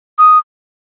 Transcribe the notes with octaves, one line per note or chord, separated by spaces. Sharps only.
D#6